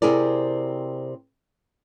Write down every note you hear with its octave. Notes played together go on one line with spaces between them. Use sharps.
C3 C4 E4 G#4 A#4 D5